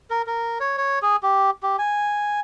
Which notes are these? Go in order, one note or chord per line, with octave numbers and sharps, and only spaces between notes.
A#4
A#4
C#5
C#5
G#4
G4
G4
G#5